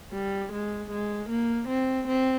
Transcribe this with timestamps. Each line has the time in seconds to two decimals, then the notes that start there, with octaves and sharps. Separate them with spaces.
0.12 G3
0.52 G#3
0.91 G#3
1.30 A#3
1.69 C4
2.08 C4